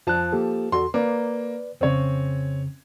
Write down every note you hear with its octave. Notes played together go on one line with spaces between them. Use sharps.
F2 F3 A5 F#6
A#3 G4 A4
E2 F#4 A4 C6
A#3 B4 D5
F2 C#3 C4 C#4 C#5